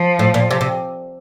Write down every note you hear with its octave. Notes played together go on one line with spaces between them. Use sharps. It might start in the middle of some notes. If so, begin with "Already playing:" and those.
Already playing: F3
A2
A#2
C3
C3